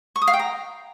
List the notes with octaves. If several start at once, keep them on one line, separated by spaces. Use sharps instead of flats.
C#6
D#6
F5
G5
A#5